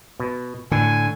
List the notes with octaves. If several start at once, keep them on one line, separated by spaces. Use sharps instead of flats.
B2
A2 D3 G#5